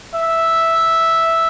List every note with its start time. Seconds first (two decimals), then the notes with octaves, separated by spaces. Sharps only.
0.14 E5